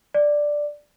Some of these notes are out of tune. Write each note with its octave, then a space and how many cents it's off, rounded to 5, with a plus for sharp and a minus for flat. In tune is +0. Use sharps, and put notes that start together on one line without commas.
D5 +5